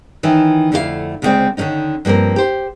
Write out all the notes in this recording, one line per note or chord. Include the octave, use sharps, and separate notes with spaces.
D#3 E3 C#4 E4
F2 D3 A3 E4 G4 F5
D2 C#3 E3 G#3 C4 D5
D3 D#3 F#3 C#4 D#4
G2 F3 A#3 C4 A#4
G4 C5